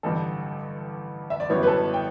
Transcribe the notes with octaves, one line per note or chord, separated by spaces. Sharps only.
A1 G2 D3 G3 A4
E5
D5
G1 F#2 E3 G3 B3 C#5
B4
A4
G5